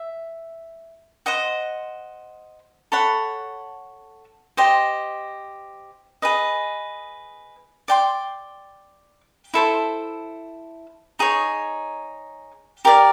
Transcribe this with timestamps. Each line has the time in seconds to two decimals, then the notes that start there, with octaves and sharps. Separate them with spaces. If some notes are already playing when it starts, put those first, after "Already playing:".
Already playing: E5
1.26 C5 D#5 F#5
2.92 A4 C#5 F#5 B5
4.57 G4 C5 D#5
6.22 G#4 B4 D#5
7.88 D5 G5 C6
9.54 E4 A4 C5
11.19 D#4 G#4 C#5
12.85 G4 A#4 D5 F5